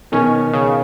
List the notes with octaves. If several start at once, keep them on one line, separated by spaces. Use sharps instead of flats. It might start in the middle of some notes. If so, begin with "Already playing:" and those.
B2 D#3 C#4
C#3